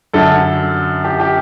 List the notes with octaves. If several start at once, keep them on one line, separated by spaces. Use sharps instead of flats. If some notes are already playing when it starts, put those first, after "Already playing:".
F#2 D3 A4
G4
G4